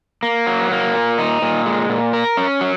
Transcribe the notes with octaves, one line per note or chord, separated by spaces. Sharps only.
A#3
F#3
A#3
A#2
D#4
A#2
G#3
A#2
A#4
C#4
F#3